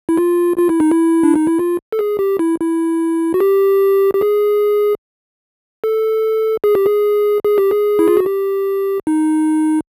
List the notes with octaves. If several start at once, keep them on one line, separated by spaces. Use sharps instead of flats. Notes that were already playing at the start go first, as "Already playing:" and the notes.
E4
F4
F4
E4
D#4
E4
D4
D#4
E4
F4
A4
G#4
G4
E4
E4
F#4
G4
G4
G#4
A4
G#4
G4
G#4
G#4
G4
G#4
E4
F4
F#4
G4
D#4